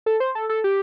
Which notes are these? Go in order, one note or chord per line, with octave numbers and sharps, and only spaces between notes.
A4
C5
A4
A4
G4